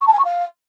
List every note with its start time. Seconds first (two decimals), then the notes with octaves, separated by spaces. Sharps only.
0.01 C#6
0.07 A5
0.13 G#5
0.19 C#6
0.25 F5